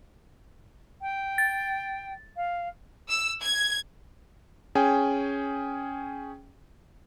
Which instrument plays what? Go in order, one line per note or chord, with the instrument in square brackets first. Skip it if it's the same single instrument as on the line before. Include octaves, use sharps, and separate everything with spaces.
[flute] G5
[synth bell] A6
[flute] F5
[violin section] E6
G#6
[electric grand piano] C#4 G#4 G5 G#5